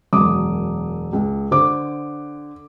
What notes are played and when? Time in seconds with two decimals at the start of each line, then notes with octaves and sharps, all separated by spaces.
0.13 E1 F#2 D6 D#6
1.13 C#2
1.51 D3 C5 D6